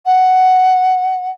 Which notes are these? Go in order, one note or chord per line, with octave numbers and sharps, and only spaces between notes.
F#5